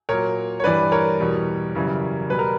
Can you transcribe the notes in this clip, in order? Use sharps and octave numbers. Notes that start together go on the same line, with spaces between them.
A#2 F#3 A#4 C#5
C#5
G2 E3 G3 B4 D5
A#4 C#5
E2 B2 G3
F#2 C#3 E3 G3
B2 G3 B4
A#4